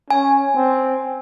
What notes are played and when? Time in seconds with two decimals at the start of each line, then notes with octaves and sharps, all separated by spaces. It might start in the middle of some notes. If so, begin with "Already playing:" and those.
0.10 C#4 G#5
0.56 C4